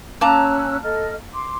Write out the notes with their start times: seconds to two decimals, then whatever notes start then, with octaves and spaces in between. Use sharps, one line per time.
0.21 A#3 C#4 A5 A#5 E6 F#6
0.83 A4 D#5 F6
1.33 C6 D6